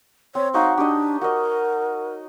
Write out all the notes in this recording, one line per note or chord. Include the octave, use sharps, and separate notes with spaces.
C4 C#5
D#4 F#4 C#5 F5
D4 G4 D#5
F#4 A#4 D#5